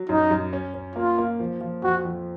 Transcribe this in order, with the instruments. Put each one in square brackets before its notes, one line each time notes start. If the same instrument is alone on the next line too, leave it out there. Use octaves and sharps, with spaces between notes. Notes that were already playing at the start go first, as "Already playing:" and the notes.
Already playing: [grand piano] F#3
[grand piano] F#2 [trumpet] D#4
[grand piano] F#2
C#4
C#4
[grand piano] A#3 [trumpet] F4
[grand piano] A#3
F3
F3
[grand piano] F2 [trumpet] F#4
[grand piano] F2